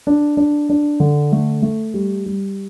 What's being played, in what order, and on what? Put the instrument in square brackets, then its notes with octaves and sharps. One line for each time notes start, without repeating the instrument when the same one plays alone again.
[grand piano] D4
D4
D4
D3
A3
A3
G3
G3